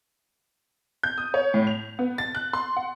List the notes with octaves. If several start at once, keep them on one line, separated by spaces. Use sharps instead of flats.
G6
D#6
C#5
A2
F7
B3
A6
F#6
C6
F#5